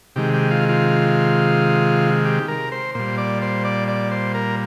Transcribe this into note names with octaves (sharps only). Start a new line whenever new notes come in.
C3 D#3 G#3 G4
G4
F4
F4
G4
A#4
C5
A#2 G3 C5
D5
C5
D5
D5
C5
A#4